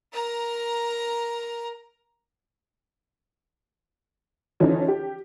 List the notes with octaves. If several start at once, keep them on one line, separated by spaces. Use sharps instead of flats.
A#4 A#5
D3 E3 F3 C#4 D#4
G4